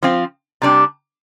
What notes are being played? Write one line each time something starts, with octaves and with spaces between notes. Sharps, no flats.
F3 C4 F4
C3 G3 D4